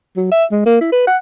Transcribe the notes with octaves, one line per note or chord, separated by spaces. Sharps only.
F#3
E5
G#3
A#3
E4
B4
F#5